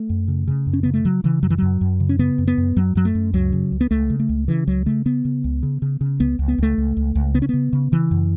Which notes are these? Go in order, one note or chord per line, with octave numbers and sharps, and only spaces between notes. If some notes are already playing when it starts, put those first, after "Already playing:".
Already playing: A3
F#2
C#3
C#3
F#2
C#4
C#3 B3
A3
C#3 F#3
C#3 E3
F#2 F#3
E3
F#2 F#3
F#2
C#3
C#4
C#3 B3
F#2
B3
F#2
F#2 F#3
F#2 F#3
A3
F#2
C#2 F#3
C#3
C#2
B3
C#2 A3
C#3
A3
C#2
C#3 E3
C#2 F#3
C#3 A3
C#3 B3
C#3
C#2
C#3
C#3
C#3
C#2 B3
C#2
B3
C#2 A3
C#2
C#2
C#2
C#3 B3
C#4
C#3 B3
C#3
C#3 E3
F#2